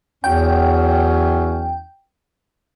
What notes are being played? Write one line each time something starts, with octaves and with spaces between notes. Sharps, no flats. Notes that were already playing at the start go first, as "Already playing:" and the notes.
E2 E3 F#3 C#4 G5